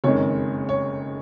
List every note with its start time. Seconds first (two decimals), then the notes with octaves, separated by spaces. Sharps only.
0.04 F#1 F2 D#3 G#3 C#5
0.69 C#5